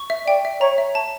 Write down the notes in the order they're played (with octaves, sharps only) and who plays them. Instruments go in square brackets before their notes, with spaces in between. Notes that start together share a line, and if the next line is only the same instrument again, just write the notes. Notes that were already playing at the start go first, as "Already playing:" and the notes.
Already playing: [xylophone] C#6
E5
[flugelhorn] D5 [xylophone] G5
[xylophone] E5
[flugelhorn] C#5 [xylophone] A#5
[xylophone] E5
A5